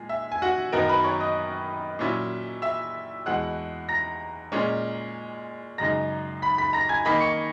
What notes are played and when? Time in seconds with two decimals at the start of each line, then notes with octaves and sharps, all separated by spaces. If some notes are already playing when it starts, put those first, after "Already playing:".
Already playing: A#2 G#3 G#5
0.09 E5
0.32 G#5
0.42 F#4 F#5
0.72 F#2 D#3 F#3 B3 D#4 A#4 A#5
0.89 B4 B5
1.04 C#5 C#6
1.20 D#5 D#6
1.99 A#2 F#3 C#4 E4
2.62 E5 E6
3.26 E2 B2 G#3 F#5 F#6
3.89 A#5 A#6
4.52 A#2 G#3 C#4
5.78 F#2 C#3 G#3 D#4 A#5 A#6
6.42 B5 B6
6.58 B5 B6
6.73 A#5 A#6
6.89 G#5 G#6
7.05 D#3 A#3 D#4 B5 B6
7.21 C#6 C#7